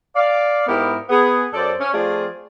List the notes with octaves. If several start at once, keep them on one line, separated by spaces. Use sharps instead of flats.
D5 F5
G#2 B3 E4 G4 A#4
B3 G#4
F#2 A4 C5 D5
C#4
F3 A3 C4 F4 G#4 D5